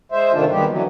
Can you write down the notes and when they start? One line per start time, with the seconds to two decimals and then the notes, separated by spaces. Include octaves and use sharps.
0.12 G#3 C5 E5
0.33 G#2 C3 D#3 A3 D4 F4
0.51 D#2 D#3 G3 G#3 B3 G4
0.69 D3 E3 F#3